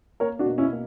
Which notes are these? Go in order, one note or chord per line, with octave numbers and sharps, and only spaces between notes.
A#3 A#4 C#5
D4 F#4
B2
C#4 E4
A#3